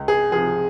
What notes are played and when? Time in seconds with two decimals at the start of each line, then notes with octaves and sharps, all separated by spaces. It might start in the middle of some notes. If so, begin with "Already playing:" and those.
Already playing: C#2
0.08 G#4
0.32 F3 G#4
0.36 C3